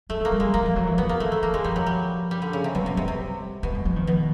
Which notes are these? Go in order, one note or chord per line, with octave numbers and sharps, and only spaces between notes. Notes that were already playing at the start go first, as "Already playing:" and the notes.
F#3 A3
F#3 A#3
G3
G#3
F#3 A#3
F3
F#3
E3
D#3 B3
A#3
A3
A3
F3 A#3
G#3
F3 G3
F#3
G3
G3
D3
C#3
C3
B2 F#3
B2
C3 G3
C3
B2 G3
G#3
F3
D#3
B2